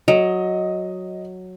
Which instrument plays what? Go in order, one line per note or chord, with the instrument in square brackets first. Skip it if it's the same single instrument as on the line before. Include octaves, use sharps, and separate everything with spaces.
[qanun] F#3 [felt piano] D#5